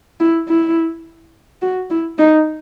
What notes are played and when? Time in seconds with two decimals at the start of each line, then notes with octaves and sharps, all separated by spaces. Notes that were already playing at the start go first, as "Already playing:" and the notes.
0.20 E4
0.48 E4
1.62 F#4
1.90 E4
2.18 D#4